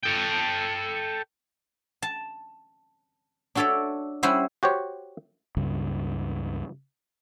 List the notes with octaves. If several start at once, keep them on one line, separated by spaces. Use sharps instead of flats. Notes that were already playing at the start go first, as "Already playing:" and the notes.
A4 G5
A5
D4 F#4 A4 C#5 D5 E5
G3 C#4 E4 C5 E5 F#5
F#4 G4 C5 C#5
C#2 G2 C#3